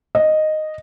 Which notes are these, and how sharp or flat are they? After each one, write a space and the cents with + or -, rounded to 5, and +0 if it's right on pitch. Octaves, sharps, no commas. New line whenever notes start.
D#5 -5